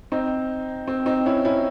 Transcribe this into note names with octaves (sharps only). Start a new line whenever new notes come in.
C4 D#4
C4
C4 D#4
C#4 E4
C#4 E4